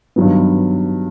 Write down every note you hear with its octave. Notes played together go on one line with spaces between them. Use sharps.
G2 D#3 F#3 B3